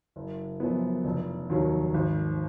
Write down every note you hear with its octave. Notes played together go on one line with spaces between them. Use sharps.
F#1
F#2 F3 B3
F1
D#2 D#3 F#3
G#1